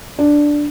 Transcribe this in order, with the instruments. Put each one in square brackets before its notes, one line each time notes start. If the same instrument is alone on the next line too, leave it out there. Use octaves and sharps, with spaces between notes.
[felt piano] D4